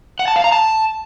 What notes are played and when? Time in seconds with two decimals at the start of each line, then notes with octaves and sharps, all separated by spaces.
0.19 F#5
0.28 A5
0.36 F5
0.44 A#5
0.52 A5